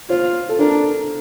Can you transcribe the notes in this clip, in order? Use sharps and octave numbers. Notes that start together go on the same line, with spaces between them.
F4 C5
A4
D4 A#4